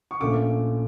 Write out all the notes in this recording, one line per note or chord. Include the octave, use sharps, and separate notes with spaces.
C#6
A#1 A#2 A3 C#4 D6